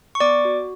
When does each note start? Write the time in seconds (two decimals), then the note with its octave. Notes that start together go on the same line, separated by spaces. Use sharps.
0.15 C#6
0.20 B3 D5 D6
0.45 F#4